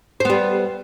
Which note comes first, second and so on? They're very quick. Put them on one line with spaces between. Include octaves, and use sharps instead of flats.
C5 B3 G3